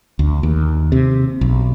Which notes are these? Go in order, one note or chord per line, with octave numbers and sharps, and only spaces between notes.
D2
D#2
C3
B1